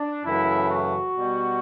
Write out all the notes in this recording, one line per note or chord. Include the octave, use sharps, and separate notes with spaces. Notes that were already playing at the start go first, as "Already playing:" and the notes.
Already playing: D4
F#2 C#3 E3 A3 E4
F#4
B2 G3